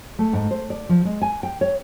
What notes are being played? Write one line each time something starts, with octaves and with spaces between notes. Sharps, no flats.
A3
G#2
C5
D5
F3
G#3
G#5
G5
C#5